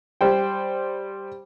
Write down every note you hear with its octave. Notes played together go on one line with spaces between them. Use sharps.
G3 C5 G5